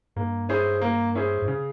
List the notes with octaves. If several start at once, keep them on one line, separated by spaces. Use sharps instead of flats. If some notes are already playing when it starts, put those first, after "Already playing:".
G2 A#3
C#4 E4 G#4 C5
A#3
C#4 E4 G#4 C5
G2
C#3